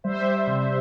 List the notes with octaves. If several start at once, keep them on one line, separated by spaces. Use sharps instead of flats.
G3 C5 E5
G3
C3